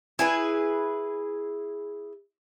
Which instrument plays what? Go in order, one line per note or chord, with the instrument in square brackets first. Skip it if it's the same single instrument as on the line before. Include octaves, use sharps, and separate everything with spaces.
[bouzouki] E4 G#4 B4